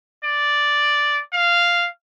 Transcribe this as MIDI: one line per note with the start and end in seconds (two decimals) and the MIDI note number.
0.24 1.20 74
1.33 1.87 77